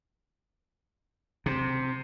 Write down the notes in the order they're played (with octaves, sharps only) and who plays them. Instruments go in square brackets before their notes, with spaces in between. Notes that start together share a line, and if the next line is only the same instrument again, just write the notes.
[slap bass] C3